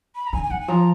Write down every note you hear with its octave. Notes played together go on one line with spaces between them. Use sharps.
B5
A#5
D3 G#5
G#5
D#3 F#5
G#5
F3 A#5